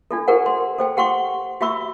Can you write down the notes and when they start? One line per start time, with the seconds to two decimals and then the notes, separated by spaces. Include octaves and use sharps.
0.11 D4 F4 A4
0.28 G4 A4 A#4 C5 F#5
0.46 C6
0.79 A4 C5 G5
0.97 G4 F#5 C6 C#6
1.61 F#4 G4 E5 B5 C#6 E6